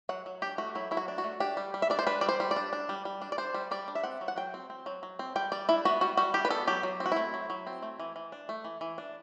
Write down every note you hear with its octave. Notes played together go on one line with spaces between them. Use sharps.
F#3 F#5
F#3
D4 G4
A3 F#4
F#3 E4
F#3 E4
F#4
D4
F#4
A3
D4 G4
G3
G3
E5
D4 D5
C5
D4 B4
G3 D5
C5
G3
D5
D4
D4
G3
G3
D4
D5
D4 C5
G3
G3 D5
D4
E5
C4 F#5
F#3
F#5
F#3 G5
C4
C4
F#3
F#3
C4
G3 G5
G3 D5
D4 E4
B3 F#4
G3 F#4
G3 F#4
D4 G4
B4
B3 A4
F#3 G4
F#3
C4
F#4
A3 E4
F#3
F#3
C4
A3
E3
E3
D4
A3
E3
E3
D4